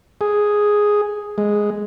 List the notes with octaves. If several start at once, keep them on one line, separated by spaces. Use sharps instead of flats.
G#4
G#3